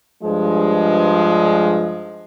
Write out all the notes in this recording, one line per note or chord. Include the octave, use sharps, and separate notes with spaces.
G2 F3 G#3